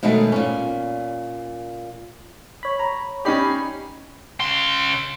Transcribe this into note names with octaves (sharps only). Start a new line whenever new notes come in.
B2 D#3 F#3 G#3 A3
A#2 C#4
C#5 B5
A#5
C#4 D#4 G4 D5 B5 C7
C#3 C6